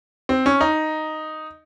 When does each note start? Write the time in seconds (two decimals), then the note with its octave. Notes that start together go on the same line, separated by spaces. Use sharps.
0.29 C4
0.46 C#4
0.61 D#4